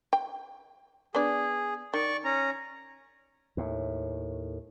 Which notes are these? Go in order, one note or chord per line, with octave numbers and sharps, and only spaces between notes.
G5
B3 D4 G#4 D5
D#3 D5 C#6
C#4 A#5
D#2 A2